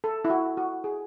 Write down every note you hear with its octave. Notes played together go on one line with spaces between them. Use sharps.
A4
E4
F#4
F#4
G#4